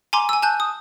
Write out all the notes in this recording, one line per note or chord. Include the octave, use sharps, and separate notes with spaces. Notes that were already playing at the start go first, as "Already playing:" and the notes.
G#5 A#5 C6 D6
G#5 E6
G#5 A5 F#6 G6
D#6